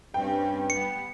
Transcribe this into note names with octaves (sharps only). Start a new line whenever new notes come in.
G2 C4 C#4 G5
G3 B3 C#7